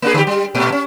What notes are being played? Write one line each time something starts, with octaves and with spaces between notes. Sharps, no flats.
A#3 D4 G#4
D3 G4
G3
A#2 A3
C#4